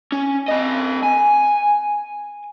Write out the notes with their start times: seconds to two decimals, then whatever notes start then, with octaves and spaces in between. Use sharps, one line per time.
0.12 C#4
0.49 C4 D#5
1.02 G#5